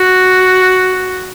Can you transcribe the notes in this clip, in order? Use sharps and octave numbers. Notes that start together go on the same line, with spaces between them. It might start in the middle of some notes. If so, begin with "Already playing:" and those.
Already playing: F#4